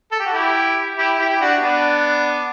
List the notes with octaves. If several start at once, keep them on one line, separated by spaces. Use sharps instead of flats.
A4
G4
F#4
E4 G4
E4 G4
E4 G4
G4
D4 F#4
B3 D4